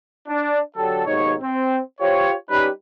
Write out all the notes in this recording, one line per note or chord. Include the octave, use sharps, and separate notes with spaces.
D4
D3 F#3 G4 A4
D#2 G#2 B2 D#4 C#5
C4
F4 G4 C5 C#5
G3 C#4 D#4 G4 B4